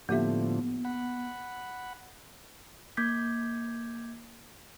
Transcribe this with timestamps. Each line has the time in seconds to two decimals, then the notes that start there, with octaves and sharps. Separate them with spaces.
0.09 A2 D3 F3 A#3 B3 G4 E5
0.85 F#5 B5
2.97 A#3 D6 G6 G#6 B6